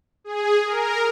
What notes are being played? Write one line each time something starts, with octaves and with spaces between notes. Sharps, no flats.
G#4
A#4